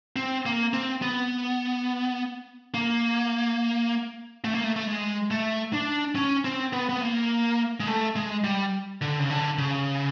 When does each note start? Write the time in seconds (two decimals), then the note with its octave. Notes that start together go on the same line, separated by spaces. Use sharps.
0.16 C4
0.46 A#3
0.73 C4
1.02 B3
2.74 A#3
4.45 A3
4.54 A#3
4.64 A3
4.76 A3
4.87 G#3
5.31 A3
5.73 D4
6.16 C#4
6.45 C4
6.73 B3
6.89 B3
7.01 A#3
7.80 G#3
7.87 A3
8.16 G#3
8.44 G3
9.01 D3
9.19 C#3
9.30 D3
9.58 C#3